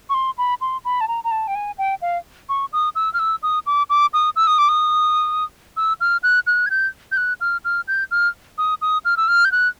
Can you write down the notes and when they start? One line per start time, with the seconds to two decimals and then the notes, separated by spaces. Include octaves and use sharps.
0.09 C#6
0.14 C6
0.38 B5
0.61 C6
0.85 B5
1.01 A5
1.08 A#5
1.24 A#5
1.31 A5
1.47 G5
1.55 G#5
1.78 G5
2.02 F5
2.49 C#6
2.73 D#6
2.95 E6
3.14 F6
3.19 E6
3.43 D#6
3.66 D6
3.90 D6
4.13 D#6
4.36 E6
4.47 D#6
4.59 D6
4.69 D#6
5.77 E6
6.01 F6
6.23 F#6
6.47 F#6
6.66 G#6
6.70 G6
7.12 G6
7.17 F#6
7.41 F6
7.65 F6
7.88 G6
8.11 F6
8.58 D#6
8.82 D#6
9.05 F6
9.17 E6
9.28 F6
9.45 G6
9.52 F#6